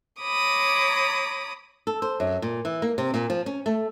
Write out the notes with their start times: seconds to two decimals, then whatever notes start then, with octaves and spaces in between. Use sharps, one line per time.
0.21 C#5 A#5 B5 D6 D#6
1.87 A4
2.02 C5
2.20 F#2
2.42 A#2
2.65 E3
2.82 A#3
2.98 C3
3.14 A#2
3.30 F3
3.46 C#4
3.66 A3